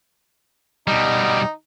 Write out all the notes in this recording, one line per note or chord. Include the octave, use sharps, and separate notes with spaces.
B2 G3 D#4